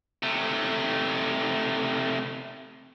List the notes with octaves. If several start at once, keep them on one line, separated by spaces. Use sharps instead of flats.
C3 A3